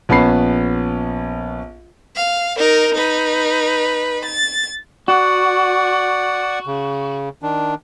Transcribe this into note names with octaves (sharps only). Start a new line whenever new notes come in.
A#1 B3 C#4 A5 B5 C7
F5
D#4 A#4
D#4 B4
A6
F#4 D5 F#5
C#3
D#3 D4